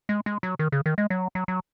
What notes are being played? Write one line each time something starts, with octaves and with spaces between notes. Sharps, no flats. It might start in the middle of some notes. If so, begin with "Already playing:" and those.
G#3
G#3
F#3
D#3
C#3
D#3
G#3
F#3
F#3
F#3